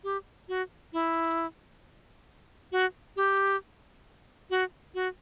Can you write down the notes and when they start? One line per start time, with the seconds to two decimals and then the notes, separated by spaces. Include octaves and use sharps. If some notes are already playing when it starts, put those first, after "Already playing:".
0.04 G4
0.49 F#4
0.93 E4
2.72 F#4
3.16 G4
4.50 F#4
4.94 F#4